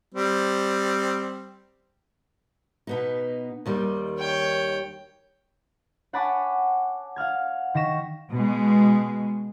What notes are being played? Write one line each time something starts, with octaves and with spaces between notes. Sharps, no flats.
G3 C4
B2 B3 D#4
D#2 D#3 G3
C#5 G5
C#5 F#5 G#5 A5 B5 D6
F5 F#5 F6 G#6
D#3 C#6 A#6 B6 E7
B2 G#3